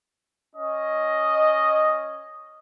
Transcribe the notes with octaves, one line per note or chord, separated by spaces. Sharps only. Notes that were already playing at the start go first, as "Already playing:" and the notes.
C#4 D#5